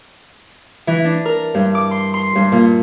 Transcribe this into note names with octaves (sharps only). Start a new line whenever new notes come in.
E3
D4
A#4
G2
D6
C6
C6
G2
A#2